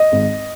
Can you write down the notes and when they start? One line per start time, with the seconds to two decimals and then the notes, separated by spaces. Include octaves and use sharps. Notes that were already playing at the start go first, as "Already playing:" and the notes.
Already playing: D#5
0.12 G#1